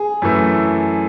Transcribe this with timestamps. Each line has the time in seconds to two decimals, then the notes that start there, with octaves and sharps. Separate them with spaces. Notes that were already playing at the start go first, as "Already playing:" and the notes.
Already playing: G#4
0.22 F#2 E3 A3 E4